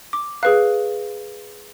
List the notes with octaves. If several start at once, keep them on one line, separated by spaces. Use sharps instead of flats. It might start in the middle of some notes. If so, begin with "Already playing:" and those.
D6
G#4 B4 F5 F#6